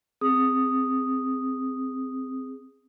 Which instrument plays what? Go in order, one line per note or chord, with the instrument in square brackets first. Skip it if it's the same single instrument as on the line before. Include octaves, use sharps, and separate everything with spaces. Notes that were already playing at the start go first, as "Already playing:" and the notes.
[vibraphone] C4 G#4 D#6